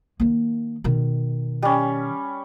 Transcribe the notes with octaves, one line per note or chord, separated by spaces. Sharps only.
D#3 A#3
B2 D#3
G3 C#4